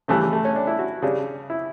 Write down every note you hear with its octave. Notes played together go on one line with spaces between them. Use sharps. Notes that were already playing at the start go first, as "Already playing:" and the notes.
C#3 E3 G3 A3
G3
A3
C#4
D4
E4
F#4
C#3 G3 D4
E4